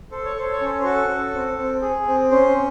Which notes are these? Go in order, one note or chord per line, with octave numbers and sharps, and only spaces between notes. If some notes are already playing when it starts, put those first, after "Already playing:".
A4 C5
C#5
A4 C5
C#5
C#4 C5
C5
F#4 A4
A4
C4
C4
G#4
C4
C#4 C5